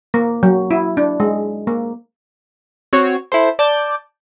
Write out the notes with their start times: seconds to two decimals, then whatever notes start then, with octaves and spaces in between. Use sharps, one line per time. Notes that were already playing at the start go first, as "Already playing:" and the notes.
0.14 A#3
0.43 F#3
0.71 E4
0.97 D4
1.20 G#3
1.67 A#3
2.93 C4 F#4 C#5
3.32 E4 A4 C5
3.59 D5 A5 D6 G6